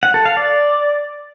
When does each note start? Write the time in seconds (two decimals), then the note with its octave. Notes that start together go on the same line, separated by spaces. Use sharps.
0.03 F#5
0.14 A4
0.25 F5
0.37 D5